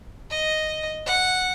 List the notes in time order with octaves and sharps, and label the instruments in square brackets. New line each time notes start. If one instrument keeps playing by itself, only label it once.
[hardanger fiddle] D#5
F#5